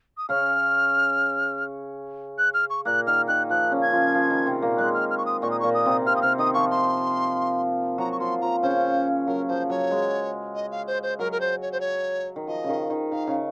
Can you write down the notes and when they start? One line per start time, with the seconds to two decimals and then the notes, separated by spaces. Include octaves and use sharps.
0.17 D#6
0.29 C#3 C#4 F6
2.38 F#6
2.54 F6
2.70 C#6
2.85 A#2 A#3 F#6
3.07 D#3 F6
3.28 D#3 F#6
3.50 F3 F#6
3.71 C#3 C#4
3.82 G#6
3.92 F3 F4
4.14 F3 F4
4.30 D#3 D#4
4.46 C3 C4
4.62 A#2 A#3
4.78 G#3 F#6
4.94 F6
5.10 F6
5.18 C#6
5.26 D#6
5.42 A#2 A#3 C#6
5.51 D#6
5.60 A#2 A#3 C#6
5.74 D#6
5.86 C3 C4
6.06 C3 C4 F6
6.16 D#6
6.22 C3 C4 F6
6.38 D#3 D#4 D#6
6.54 F3 F4 C#6
6.71 C6
7.98 F#3 F#4 A#5
8.12 C#6
8.20 F3 F4 C6
8.41 F3 F4 A#5
8.62 C#3 C#4 C5
9.27 F#3 A#4
9.48 F3 C5
9.70 F#3 C#5
9.91 G#3
10.55 D#5
10.71 F5
10.87 C5
11.03 C5
11.19 F#3 A#4
11.32 A#4
11.40 C5
11.62 C#5
11.72 C5
11.80 C#5
12.36 D#3
12.47 F3 D#5
12.64 C#3
12.69 D#3
12.90 D#3
13.12 D#3 F5
13.27 C#3